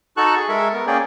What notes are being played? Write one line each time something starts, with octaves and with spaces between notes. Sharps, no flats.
D#4 F#4 A4 A5 C#6 F#6
G#4
G#3 A4 A#4 E5 C#6
B3 A#4
A#3 C#4 G#4 D5 G5